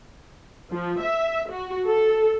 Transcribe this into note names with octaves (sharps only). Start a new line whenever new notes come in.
F3
E5
F#4
A4